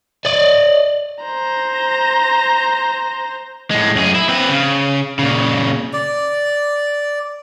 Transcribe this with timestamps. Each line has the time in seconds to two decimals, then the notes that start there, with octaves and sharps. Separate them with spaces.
0.25 D5 D#5
1.24 C5 A#5
3.71 A2 G#3
3.95 F#2 G#4
4.15 E4
4.29 C4 B4
4.49 C#3
5.19 A#2 C#3
5.93 D5